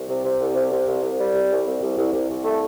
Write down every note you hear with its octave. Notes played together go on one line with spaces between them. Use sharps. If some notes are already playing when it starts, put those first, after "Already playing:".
Already playing: C2
C3
C3
C2
C3
C3
C2
C2
G3
C3
C2
C2
C2
C2
C2
C2
A3